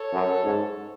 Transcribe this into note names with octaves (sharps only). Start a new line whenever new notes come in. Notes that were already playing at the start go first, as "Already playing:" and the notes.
Already playing: A4 C#5
F#2
G#2